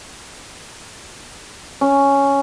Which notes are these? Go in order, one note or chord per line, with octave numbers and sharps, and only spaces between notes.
C#4